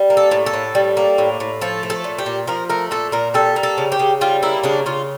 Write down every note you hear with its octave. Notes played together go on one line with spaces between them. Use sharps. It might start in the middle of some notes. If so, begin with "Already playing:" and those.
Already playing: G3
A#3
A4
A2
A4
A2
G3
A#3
A2
A2
F3 A4
A3
A4
A#2
G4
A#2
F3 A#4
A3 A#4
A#2 A4
A#2 A#4
G3 A4
A#3
A4
C#3
G4
C#3
G3 F4
A#3 E4
C#3 D4
C#3 F4